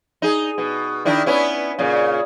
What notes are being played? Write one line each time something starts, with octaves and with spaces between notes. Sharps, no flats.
D#4 G#4
B2
D#3 D4 E4
B3 C#4 E4
A#2 C#3